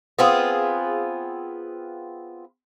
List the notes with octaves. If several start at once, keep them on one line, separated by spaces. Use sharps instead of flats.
B3 C4 F4 G#4